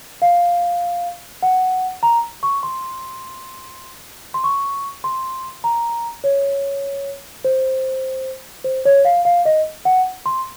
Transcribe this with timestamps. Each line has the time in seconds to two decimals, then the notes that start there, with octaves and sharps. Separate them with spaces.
0.22 F5
1.43 F#5
2.03 A#5
2.43 C#6
2.63 C6
4.34 C6
4.44 C#6
5.04 C6
5.64 A#5
6.24 C#5
7.45 C5
8.64 C5
8.85 C#5
9.05 F5
9.25 F5
9.45 D#5
9.85 F#5
10.26 C6